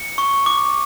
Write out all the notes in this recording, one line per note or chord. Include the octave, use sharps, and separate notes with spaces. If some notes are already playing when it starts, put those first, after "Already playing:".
Already playing: C#7
C#6
D6